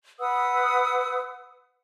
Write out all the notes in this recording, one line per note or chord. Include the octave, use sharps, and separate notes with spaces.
B4 F#5 D#6 E6